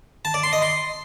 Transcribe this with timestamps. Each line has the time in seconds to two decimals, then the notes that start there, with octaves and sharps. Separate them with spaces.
0.25 A5
0.34 D5
0.43 C6
0.53 D#5
0.62 C6